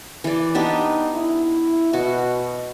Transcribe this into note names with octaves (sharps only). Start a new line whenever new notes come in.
E3 D5
B3 D4 D#4 G4
E4
B2 F#4